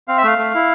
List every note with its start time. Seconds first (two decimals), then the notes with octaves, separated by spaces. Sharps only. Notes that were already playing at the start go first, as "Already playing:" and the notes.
0.08 C4 F5
0.18 E5
0.24 A3 F5
0.38 A3
0.55 E4